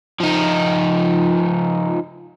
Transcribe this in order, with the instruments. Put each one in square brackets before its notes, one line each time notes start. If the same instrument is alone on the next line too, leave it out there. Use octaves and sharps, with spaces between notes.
[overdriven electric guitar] F3 D#4